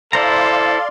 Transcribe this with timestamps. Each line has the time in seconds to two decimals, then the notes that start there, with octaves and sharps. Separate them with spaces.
0.13 E4 A4 C5 D5 F5 A#5 C6